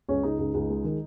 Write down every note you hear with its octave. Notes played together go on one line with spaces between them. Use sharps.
C#2 C#4
C#3 D#4
C#2
C#2
G#3
D#3